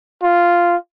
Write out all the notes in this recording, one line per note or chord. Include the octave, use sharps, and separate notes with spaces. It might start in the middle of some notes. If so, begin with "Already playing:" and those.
F4